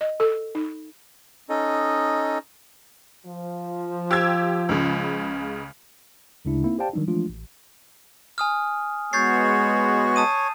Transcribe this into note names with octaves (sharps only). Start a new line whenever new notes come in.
D#5
A4
D#4
C#4 D#4 A4 D#5
F3
G4 E6 G#6
C#2 C#3
D2 C#3 G#3 D4 E4
A#3 C4 D#4 E4
G4 C5 D5 F5 G5 A5
D#3 F#3 G3 D4 D#4
E3 F3 G#3 A3 D4 F4
A1
G#5 D#6 F6
G#3 B3 F#4 C#5 G6 A6 C7
A5 D#6 D#7